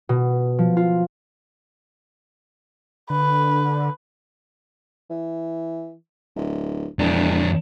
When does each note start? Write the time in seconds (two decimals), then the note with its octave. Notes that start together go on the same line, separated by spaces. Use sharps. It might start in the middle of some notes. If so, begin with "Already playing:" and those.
0.09 B2
0.59 F3
0.77 F4
3.10 D3 B4
5.10 E3
6.36 D1
6.99 E1 F2 D4